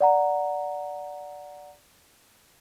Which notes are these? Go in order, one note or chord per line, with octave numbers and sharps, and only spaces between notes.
D5 F#5 A#5